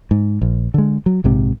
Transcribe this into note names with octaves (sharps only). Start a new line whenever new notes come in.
G#2
A#1
D3 G#3
F#3
A#1 G#2 C3